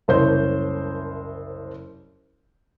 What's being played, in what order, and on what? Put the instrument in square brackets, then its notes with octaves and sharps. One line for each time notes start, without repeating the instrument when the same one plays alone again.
[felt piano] F#1 C2 C5 C#5 G6